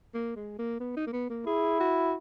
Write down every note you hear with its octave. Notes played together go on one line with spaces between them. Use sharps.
A#3
G#3
A#3
B3
D#4
A#3
B3
A#3
E4 G#4
F#4